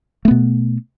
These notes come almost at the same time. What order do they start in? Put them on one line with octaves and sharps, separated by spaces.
A3 B3 B2